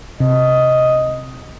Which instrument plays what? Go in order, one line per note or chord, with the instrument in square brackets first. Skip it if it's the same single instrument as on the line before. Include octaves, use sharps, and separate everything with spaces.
[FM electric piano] C3 [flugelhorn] D#5